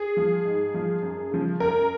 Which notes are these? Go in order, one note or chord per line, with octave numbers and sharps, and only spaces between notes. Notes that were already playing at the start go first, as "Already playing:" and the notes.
Already playing: G#4
F3
G#2
F3
F#2
C#3 F3
F#2 A#4